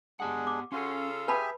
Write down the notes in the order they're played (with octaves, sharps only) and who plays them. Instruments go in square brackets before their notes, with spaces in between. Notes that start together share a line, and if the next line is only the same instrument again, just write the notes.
[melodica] G#3 D4 G#4 [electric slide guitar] B3 G4 F#5
[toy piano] D6
[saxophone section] C#3 F4 A4 [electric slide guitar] C#4 C#5 [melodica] F#4 C6
[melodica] E6
[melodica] G4 G#4 E5 [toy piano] B4 A5 B5 [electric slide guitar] G#5